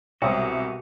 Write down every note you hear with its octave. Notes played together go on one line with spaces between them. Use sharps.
C2 G#2 B2 F#3 G#3 C4 F#4 D#6